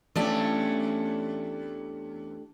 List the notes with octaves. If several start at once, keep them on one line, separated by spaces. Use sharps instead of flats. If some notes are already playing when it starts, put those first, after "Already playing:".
E2 A3 C#4 D4 G4